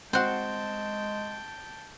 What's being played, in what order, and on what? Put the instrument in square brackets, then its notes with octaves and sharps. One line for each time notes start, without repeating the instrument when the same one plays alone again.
[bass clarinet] G#3 [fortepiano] C4 F#4 [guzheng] C5 F#5 [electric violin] G5 A5